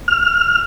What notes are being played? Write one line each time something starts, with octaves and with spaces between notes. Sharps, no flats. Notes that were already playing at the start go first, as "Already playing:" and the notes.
F6